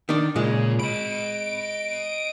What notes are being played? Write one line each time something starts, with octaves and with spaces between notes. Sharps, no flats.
D#3 D4
A#2 C#3 G#3
D#5 B5 D7